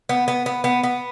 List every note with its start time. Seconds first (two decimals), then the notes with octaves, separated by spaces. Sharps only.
0.09 B3
0.28 B3
0.46 B3
0.64 B3
0.83 B3